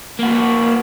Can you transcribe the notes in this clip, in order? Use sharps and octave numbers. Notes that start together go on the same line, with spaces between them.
A#3 F#4